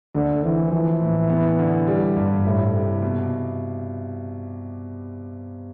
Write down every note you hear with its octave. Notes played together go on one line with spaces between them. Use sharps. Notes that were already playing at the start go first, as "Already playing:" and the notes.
D2 D3
E3 C4
E3 F3
A2
B3
D3
G3
G2
A2 E4
C3
B2